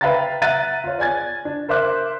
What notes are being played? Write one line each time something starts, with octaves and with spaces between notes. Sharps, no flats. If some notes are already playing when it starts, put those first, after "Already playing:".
B4 E5 F5 G5 A#5 A6
E5 F#5 A#5 F#6 A6 D#7
F4 C#5
D5 G#5 G#6 A6
D4
A#4 C5 E5 D6 F#6